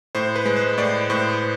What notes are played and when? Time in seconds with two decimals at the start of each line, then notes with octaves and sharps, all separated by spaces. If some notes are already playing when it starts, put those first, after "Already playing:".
0.15 A2 C5
0.36 B4
0.46 G#3
0.57 C5
0.78 A2 D5
1.10 A2 C5